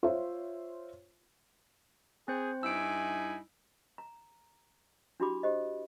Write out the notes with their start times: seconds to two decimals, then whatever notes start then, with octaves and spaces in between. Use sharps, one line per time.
0.03 F4 C5 C#5 E5
2.28 C4 G#4 C5
2.63 G2 D#4 E4 G#5 E6 D7
3.98 A#5
5.20 D4 E4 F#4 G4 B5 D6
5.43 G4 C5 D#5